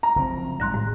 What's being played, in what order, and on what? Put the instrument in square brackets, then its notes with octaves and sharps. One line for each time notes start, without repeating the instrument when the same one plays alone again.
[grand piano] A#5
[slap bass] F#1 F3 C4
[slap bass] G#1 G#2 G3 [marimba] C6 F#6 A#6
[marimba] A2